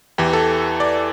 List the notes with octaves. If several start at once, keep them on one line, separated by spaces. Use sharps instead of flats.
E2 E3 G4
A4
D5